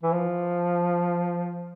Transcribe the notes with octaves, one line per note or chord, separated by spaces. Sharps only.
E3
F3